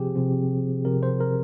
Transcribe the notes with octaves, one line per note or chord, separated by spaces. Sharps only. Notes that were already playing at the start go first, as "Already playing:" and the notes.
Already playing: C3 F3 C4 G4 G#4
C3 F3 C4
C3 F3 C4 A#4
C5
A#4